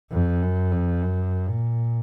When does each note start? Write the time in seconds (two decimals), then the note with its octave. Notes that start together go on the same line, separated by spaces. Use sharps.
0.11 F2
0.42 F#2
0.72 F2
1.02 F#2
1.49 A#2